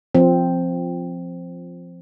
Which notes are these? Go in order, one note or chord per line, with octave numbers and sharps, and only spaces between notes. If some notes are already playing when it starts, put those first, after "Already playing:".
F3 C4